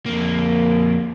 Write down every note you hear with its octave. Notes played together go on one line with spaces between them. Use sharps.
F2 A#3